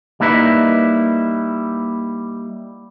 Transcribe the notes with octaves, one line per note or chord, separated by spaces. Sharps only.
G3 A#3 D#4 E4 B4